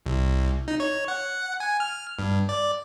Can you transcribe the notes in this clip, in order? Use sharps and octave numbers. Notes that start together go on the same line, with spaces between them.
C2
D#4
C#5
F#5
G#5
F6
G2
D5